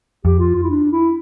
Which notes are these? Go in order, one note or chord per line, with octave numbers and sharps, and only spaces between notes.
F2 G4
F4
F4
E4
D4
E4